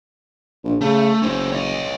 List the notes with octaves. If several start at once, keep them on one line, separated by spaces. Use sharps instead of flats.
A#1
C#3 A3
F#1 C#4 C5
C#5 D#5